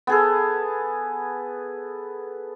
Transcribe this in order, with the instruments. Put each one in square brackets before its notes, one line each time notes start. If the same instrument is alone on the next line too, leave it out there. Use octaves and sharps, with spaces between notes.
[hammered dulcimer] B3 G#4 A4